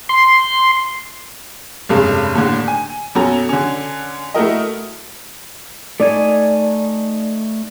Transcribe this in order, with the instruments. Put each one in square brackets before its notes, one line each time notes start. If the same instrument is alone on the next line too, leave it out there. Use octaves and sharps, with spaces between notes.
[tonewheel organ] C6
[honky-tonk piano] F1 G2 C#3 G#3 A4
D#2 A2 D3
G#5
F#2 B2 C#4 F#4 A4 A#5
D3 C#4
A3 E4 F#4 A#4 D#5
[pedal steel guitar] A3 D#4 G#5 [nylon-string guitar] D5